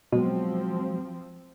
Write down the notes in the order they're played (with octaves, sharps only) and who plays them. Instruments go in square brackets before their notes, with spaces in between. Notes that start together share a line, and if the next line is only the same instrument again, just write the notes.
[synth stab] B2 [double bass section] F3 C4 [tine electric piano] F#3 G#3 F#4